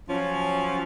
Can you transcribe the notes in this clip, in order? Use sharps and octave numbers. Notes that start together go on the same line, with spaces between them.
F3 F#3 C#4